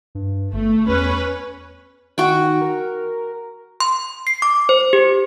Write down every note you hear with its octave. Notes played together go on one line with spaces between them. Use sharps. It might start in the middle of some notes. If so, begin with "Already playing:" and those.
G2
G1 A3
E2 C#4 B4
D#3 F#4 G5
A#4
C6
C7
D6
C5
G4